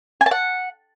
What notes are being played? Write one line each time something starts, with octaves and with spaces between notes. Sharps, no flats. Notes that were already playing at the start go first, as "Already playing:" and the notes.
G#5
A5
F#5